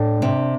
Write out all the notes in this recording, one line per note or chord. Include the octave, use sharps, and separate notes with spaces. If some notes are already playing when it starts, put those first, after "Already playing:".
Already playing: A2 D4
C3